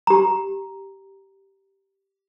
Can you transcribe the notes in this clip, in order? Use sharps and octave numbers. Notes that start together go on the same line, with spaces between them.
G4 A#5